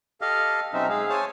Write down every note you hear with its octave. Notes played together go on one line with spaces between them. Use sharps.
G4 A4 D#5 F5 F6
B2 F#3 C4 C#4 D#4 E5
G#3 G#4 F5 E6
C5 C#5 G#5 A5